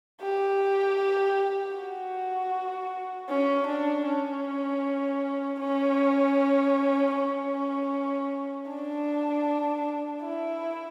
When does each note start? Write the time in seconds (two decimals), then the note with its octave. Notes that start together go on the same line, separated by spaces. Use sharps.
0.21 G4
1.76 F#4
3.29 C#4
3.67 D4
4.06 C#4
5.60 C#4
7.14 C#4
8.68 D4
10.22 E4